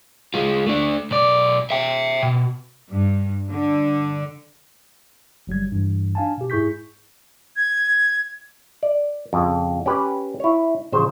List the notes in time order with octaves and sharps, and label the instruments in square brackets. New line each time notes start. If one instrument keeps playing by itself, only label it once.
[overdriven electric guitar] G#3 F4
A3 D4
B1 D5
E5 G5
B2
[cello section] G2
D3
[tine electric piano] G1 F#3 G3 G#6
G2 E3
D4 F5 G#5 A5
B2 G4
G#2 E4 G#4 C#6 G6 B6
[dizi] G#6
[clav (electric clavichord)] D5
F2 C#3
C#4 G4 B4
E4 C#5
A1 C#3 F3 C5